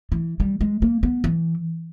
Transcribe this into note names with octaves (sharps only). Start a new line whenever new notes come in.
E3
G3
G#3
A#3
B3
E3